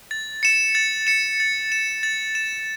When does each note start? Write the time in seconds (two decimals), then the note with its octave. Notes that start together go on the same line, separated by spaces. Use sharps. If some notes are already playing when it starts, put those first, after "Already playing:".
0.11 A6
0.43 C#7 E7
0.75 A6
1.07 C#7 E7
1.40 A6
1.72 E7
2.03 A6
2.35 E7